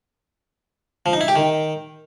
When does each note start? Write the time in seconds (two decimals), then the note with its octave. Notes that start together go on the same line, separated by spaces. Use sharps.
1.06 F3
1.13 D#4
1.21 E4
1.28 G4
1.36 D#3